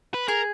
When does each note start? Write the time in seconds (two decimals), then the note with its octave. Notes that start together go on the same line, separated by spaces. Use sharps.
0.14 B4
0.28 G#4 A#4